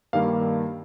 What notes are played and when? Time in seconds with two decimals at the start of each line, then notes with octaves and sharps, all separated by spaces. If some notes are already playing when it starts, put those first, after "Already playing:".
0.13 G2 D#3 G3 A#3 F5